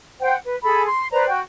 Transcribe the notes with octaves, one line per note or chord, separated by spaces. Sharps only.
C5 F#5 G5
B4
G#4 A4 B5
C6
B4 C5 D5 A#5
F#4 G5